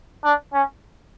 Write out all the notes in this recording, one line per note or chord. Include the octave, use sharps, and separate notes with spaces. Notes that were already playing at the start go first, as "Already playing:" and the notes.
D4
C#4